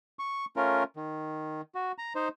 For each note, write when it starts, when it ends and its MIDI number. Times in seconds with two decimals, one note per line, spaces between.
0.19 0.45 85
0.56 0.83 57
0.56 0.83 61
0.56 0.83 65
0.56 0.83 70
0.97 1.61 51
1.75 1.92 66
1.98 2.13 82
2.15 2.28 63
2.15 2.28 72